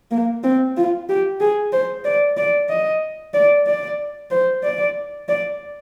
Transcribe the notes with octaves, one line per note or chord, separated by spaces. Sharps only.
A#3
C4
F4
G4
G#4
C5
D5
D5
D#5
D5
D5
C5
D5
D5